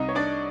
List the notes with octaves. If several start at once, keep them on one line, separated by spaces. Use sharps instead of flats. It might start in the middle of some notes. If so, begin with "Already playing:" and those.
Already playing: C2 D#4 D#5
C#5
D4 D5